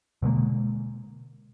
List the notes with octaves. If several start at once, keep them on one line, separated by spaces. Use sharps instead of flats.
B2 D3 G#3 A#3